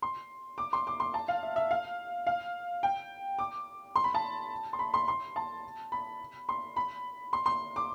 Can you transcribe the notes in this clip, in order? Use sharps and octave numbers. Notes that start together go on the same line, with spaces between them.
C6
D6
C6
D6
C6
A5
F5
E5
E5
F5
F5
G5
D6
C6
B5
A5
C6
B5
C6
C6
A5
B5
C6
B5
C6
C6
D6